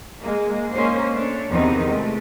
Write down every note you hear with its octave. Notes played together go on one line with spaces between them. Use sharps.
G#3 A#3
A#3 C#4 D#4 C5
A3 D4 C#5
E2 C3 D#3 E3 C4 D#4
G#3 A3